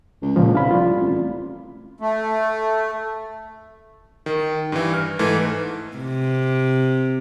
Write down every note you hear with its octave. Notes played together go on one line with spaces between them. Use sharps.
C#2
A#2 C#3 F3
C2 D4 F5 B5
F4 D5
A1
A3
D#3
G2 E3
F6
G#2 E3 A3
C3